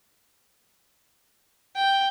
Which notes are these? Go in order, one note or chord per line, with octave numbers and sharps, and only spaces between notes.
G5